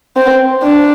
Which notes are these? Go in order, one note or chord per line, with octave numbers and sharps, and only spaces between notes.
C4
D4